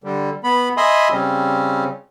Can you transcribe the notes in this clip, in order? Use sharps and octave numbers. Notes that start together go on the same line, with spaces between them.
D3 G3
B3 B5
D#5 E5 G#5 B5 C6 D#6
C#3 G3 C4 C#4